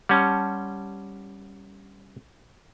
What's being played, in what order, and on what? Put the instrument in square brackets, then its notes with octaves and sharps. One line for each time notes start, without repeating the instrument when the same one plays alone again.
[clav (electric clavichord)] G3 C#4 [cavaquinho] F#5 A5 C6